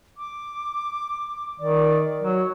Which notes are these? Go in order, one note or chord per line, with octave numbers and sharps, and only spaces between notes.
D6
D#3 D5
F#3 C#5